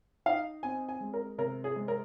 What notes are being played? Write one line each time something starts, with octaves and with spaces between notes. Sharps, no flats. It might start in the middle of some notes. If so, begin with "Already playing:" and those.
D#4 F5
C4 G#5
G#5
G#3
A#4
C3 A#4
G#4
G#3
A#4